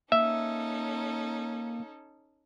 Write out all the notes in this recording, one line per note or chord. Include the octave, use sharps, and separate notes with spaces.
A#3 C#4 D#4 A4 E5